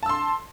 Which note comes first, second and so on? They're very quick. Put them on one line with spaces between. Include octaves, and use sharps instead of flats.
A5 E6 C6